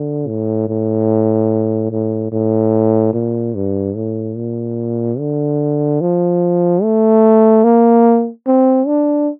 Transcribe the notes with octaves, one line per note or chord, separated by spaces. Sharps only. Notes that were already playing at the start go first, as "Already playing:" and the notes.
Already playing: D3
A2
A2
A2
A2
A#2
G2
A2
A#2
D3
F3
A3
A#3
C4
D4